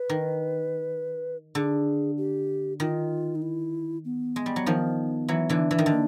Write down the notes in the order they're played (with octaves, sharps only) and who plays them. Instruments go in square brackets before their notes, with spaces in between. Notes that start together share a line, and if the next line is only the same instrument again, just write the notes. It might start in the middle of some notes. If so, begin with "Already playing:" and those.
Already playing: [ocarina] B4
[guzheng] D#3
[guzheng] D3 [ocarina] G#4
[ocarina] G4
[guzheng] D#3 [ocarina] F4
[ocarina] D#4
E4
B3
[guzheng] G#3
G3
F#3
D#3 F3
E3 F#3
D3 E3
E3
D#3
D3
[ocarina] A#3